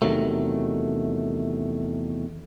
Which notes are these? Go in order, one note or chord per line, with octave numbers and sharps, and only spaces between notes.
E2 C3 D#3 F#3 A3